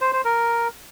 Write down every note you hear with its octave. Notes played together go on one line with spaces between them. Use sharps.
C5
C5
A#4